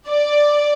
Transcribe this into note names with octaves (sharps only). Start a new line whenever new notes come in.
D5